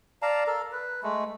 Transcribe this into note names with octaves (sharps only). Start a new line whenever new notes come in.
D5 F5 A5 A#5
A4 A#4
B4
G#3 A3